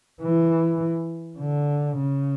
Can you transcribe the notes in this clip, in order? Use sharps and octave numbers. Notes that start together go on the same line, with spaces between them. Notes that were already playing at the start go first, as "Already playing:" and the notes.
E3
D3
C#3